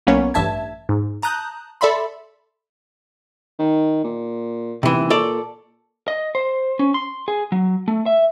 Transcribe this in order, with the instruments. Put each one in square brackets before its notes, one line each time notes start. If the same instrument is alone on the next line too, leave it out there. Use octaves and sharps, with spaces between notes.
[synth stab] B1 A#3 B3 C#4 C#5
A1 G2 E5 A5 G#6
G#2
A5 A#5 D#6 F#6 G6
A4 D5 E5 B5 C6
[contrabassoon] D#3
A#2
[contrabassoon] D#1 [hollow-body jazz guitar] C3 E3
[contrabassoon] A#2 [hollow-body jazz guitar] A4 C#5 D5
[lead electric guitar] D#5
C5
C#4
C6
G#4
F#3
A3
E5